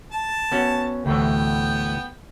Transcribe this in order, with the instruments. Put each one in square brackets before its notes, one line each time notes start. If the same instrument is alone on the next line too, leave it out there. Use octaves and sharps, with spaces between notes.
[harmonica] A5
[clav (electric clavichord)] B3 C#4 F#4
[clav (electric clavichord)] D2 A2 E3 [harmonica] B3 G5